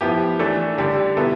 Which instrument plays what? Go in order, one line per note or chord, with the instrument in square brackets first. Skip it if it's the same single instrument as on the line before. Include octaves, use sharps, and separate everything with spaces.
[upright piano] F3 B3 E4 G4
E3 A3 D4 A4
D3 G3 D4 G4
B2 B3 E4 A4